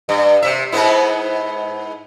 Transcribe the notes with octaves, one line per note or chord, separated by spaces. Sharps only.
G2
C3 E5
G#2 B3 E4